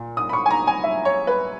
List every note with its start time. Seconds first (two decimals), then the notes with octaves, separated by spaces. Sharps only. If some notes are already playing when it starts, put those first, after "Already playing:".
Already playing: A#2
0.17 D#6
0.29 B5
0.33 C#6
0.46 G#5
0.51 A#5
0.67 G#5
0.84 E5
1.05 C#5
1.27 B4